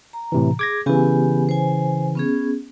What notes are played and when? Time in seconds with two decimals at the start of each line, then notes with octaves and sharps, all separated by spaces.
0.13 A#5
0.32 A2 C3 E3
0.59 G#4 D6 G#6 A#6
0.86 C#3 E3 B3 G4 G#5
1.49 C5 G#5
2.15 B3 C#4 G#4